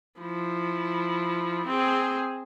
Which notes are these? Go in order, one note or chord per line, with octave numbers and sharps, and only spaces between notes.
F3 E4
C4 G#4